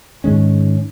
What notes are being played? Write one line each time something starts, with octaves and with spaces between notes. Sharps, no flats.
G#2 D#3 G#3 C#4